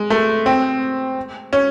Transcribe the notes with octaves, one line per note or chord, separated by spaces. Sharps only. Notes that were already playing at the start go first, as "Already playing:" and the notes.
Already playing: G#3
A3
C4
C#4